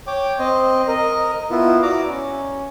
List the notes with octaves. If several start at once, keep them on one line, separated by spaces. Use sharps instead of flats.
C#5 G5 D6
C4 C5 D#5
A#4 D#5
B3 E4 F4
E4 F#4 D5 A#5 D6
C#4